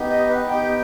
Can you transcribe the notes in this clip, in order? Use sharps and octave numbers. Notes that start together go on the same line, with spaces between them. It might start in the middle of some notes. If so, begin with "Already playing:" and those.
Already playing: B3 D#4 G4
D#5
B4
B3 D#4 G4 G5